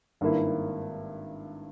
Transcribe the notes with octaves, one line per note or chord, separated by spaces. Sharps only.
G#1 G2 D#3 A#3 E4